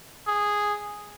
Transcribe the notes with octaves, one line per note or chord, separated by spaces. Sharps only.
G#4